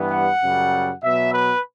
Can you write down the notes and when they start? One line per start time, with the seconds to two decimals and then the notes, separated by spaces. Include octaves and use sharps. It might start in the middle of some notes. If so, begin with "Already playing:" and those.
Already playing: G2 E3 G3 B3
0.12 F#5
0.42 F#2 C#3 G3
1.03 B2 F#3 B3 E5
1.33 B4